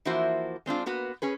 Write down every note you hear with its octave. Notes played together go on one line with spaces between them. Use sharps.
E3 F3 A#3 E4 F#4 C5
G#3 C4 D4 F4
A#3 B3 F#4 B4
C#4 G#4 B4